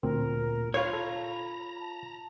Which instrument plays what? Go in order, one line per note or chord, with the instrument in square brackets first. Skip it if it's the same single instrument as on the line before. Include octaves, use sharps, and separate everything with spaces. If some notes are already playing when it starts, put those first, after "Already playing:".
[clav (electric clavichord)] D2 C4 [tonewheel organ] A#2 [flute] A#4
[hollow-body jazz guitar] F4 C#5 [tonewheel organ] F5 A#5 [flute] B5
[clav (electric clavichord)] A4 [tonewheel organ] A#5
[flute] A5